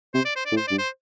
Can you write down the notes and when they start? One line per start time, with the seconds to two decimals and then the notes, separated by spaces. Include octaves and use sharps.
0.14 C3 C5
0.25 D5
0.36 C5
0.46 D5
0.52 A2
0.57 C5
0.67 G2 D5
0.78 C5